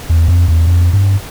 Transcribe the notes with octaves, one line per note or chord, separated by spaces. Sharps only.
E2
F2
E2
F2
G2